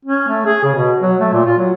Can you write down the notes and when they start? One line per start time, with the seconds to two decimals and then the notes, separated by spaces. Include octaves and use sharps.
0.05 C#4
0.28 A3
0.46 G#4
0.64 C#3
0.75 B2
1.01 F#3
1.20 A3
1.33 A#2
1.46 F4
1.57 F#3